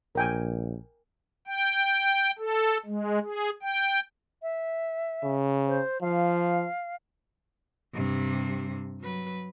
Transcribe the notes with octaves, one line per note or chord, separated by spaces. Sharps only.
A#1 A#4 G5 G#5
G5
A4
G#3
G#4
G5
E5
C#3
C5
F3 F5
G2 C3
F#3 B4